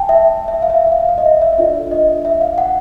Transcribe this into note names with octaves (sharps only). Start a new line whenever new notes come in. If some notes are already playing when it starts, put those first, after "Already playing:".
Already playing: G5 A5
E5
E5
F5
E5
E5
F5
F5
D#5
E5
E5
D#5
D4 F4 A4 D5 E5
D#5
E5
F5
F#5